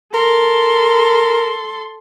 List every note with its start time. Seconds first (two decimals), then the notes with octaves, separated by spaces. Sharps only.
0.14 A4 A#4 C6